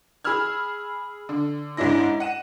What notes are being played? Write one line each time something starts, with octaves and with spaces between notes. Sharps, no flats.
G#4 B5 E6 F6 G#6
D3
G#2 C#4 D4 E4 A#6
F#5 D#7 E7